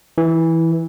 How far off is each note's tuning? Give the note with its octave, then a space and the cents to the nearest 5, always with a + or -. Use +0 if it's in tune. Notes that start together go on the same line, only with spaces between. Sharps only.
E3 -10